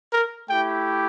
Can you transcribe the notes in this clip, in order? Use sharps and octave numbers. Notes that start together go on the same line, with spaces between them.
A#4
A3 E4 G4 G5